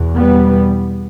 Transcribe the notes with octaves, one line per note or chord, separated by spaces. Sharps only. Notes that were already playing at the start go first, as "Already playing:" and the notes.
Already playing: E2 B2
G3 B3